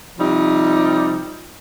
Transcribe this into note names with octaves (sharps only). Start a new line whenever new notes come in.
C3 F3 G3 D#4